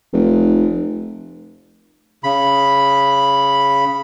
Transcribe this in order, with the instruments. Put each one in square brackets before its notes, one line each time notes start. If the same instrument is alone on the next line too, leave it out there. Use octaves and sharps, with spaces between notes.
[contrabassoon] F1
[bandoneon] C#3 B5